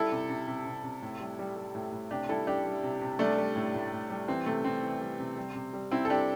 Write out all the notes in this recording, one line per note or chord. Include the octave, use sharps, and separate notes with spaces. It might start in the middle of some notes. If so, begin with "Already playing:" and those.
Already playing: G3 E4 A4
C3
C3
C3
C3
C3
A2
G3
G3
G3
A2
A2
C3 D4 G4
G3 E4 A4
G3 D4 G4
G3
C3
C3
G3 A3 D4
G3
A2
A2
A2
G3
E3 C4
C3 A3
C3 C4
E3
G3
C3
G3
C3
G3
C3 C4 E4
A4
G3 D4 G4